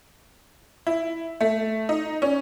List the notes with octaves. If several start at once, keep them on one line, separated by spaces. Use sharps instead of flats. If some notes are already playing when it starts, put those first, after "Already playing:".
E4
A3
D#4
C#4